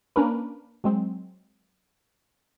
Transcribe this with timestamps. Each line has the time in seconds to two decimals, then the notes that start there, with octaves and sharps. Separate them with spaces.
0.16 A#3 C#4 D4 A#4 B4
0.84 F#3 G#3 C4